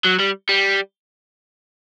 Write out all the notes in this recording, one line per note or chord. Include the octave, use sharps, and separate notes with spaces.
F#3
G3
G3